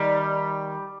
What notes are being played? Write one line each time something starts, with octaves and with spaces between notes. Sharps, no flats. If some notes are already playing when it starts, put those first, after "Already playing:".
Already playing: D#3 G3